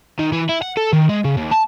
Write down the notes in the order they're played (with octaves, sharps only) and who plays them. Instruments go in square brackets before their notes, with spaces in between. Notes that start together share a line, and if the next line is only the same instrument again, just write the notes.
[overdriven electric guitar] D#3
E3
E4
F#5
A4
D#3
G#3
C#3
D#2
A5